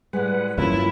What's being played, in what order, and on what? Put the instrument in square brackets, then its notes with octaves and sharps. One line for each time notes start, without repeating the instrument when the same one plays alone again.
[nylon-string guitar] A2 G3 G#3 [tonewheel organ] B4 F#5
[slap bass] G2 C3 E3 [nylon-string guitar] F#3 A#3 C#4 [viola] E4 [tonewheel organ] F4